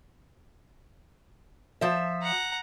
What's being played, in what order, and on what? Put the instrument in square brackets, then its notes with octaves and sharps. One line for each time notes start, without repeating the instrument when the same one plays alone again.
[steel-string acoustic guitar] F3 E5
[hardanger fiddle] F#5 A#5